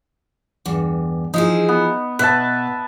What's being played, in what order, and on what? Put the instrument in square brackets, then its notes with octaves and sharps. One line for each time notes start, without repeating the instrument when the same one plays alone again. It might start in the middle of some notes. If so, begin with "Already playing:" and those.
[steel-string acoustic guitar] E2 G2
[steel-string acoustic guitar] F3 E4 G#4 [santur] D#4
[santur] B3
[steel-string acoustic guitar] B2 [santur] B4 E5 A5